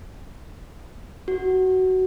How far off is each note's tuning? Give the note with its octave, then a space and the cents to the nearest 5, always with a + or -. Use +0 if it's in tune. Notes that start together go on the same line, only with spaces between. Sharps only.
F#4 +15